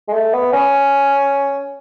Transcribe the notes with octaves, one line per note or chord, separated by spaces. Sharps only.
G#3
A3
B3
C#4